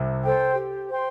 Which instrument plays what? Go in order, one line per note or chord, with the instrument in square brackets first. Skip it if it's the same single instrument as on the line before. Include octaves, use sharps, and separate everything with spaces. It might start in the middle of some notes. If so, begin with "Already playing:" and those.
Already playing: [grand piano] C2 C3
[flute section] A4 C5 G5
G4
C5 G5 C6